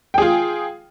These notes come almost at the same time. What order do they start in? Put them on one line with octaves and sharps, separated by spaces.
G5 G#4 F4